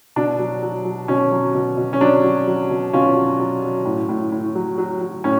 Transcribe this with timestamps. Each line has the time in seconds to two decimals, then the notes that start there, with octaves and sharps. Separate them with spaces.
0.16 B2 D4
0.39 F#3
0.62 F#3
0.85 F#3
1.08 B2 C#4
1.31 F#3
1.55 B2
1.77 B2
1.93 C#4
2.01 F#3 D4
2.24 F#3
2.47 F#3
2.70 B2
2.93 B2 C#4 F4
3.16 F#3
3.39 F#3
3.63 F#3
3.85 A2
4.09 A2
4.32 A2
4.55 F#3
4.78 F#3
5.01 F#3
5.24 A2 C#4